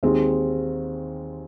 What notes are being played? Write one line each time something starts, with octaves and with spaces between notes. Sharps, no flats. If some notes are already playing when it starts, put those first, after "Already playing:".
D#2 D#3 G#3 C4